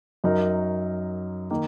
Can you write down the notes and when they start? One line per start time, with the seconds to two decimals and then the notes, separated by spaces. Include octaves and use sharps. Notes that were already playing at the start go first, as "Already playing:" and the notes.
0.24 F#2 F#3 D#4 A#4
1.51 D#3 A#3